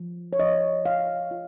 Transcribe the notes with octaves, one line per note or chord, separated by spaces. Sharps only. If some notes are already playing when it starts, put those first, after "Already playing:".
Already playing: F3
C#5
F3 D#5
F3 F5
F4